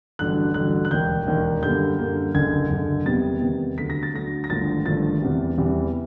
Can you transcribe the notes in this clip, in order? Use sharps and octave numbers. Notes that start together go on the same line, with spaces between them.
A1 G2 D3 F#3 F#6
A1 G2 D3 F#3 F#6
F#6
E1 D#2 D#3 G6
E1 D#2 D#3
F#2 D3 G3 A#3 G6
F#2 D3 G3 A#3
F#1 F#2 D3 G#6
F#1 F#2 D3
E2 C3 D#3 G3 B3 A6
E2 C3 D#3 G3 B3
D2 D3 F#3 B6
A#6
A6
D2 D3 F#3 A#6
A#6
G#1 G2 D3 F3 A3 A6
G#1 G2 D3 F3 A3 A6
E2 C3 E3 G3
E2 C3 E3 G3